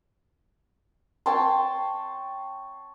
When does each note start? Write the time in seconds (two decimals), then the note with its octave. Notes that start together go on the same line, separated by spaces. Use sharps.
1.26 C#5 G5 A5 C6